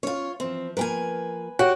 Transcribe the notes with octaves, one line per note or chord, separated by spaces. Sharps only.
C#4 F4 C#5
E3 F3 C4
F3 A#3 A#4 B4 G5 G#5
F#4 G4 C#5